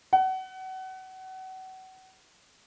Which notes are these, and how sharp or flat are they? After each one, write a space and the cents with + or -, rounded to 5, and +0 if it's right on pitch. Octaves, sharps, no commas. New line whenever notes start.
F#5 +30